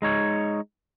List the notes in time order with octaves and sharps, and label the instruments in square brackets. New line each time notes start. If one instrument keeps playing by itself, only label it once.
[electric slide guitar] G#3 D#4 C#5